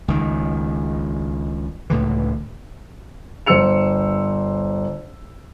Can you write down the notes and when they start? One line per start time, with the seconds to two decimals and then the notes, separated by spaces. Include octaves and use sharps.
0.08 C#2 D#3
1.90 C#2 A2 D3 E3
3.46 G1 C5 E6 C#7 F7